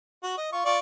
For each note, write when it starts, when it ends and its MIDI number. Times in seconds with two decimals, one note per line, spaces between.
0.23 0.36 66
0.38 0.48 75
0.52 0.65 65
0.52 0.65 85
0.65 0.79 65
0.65 0.79 74
0.65 0.79 85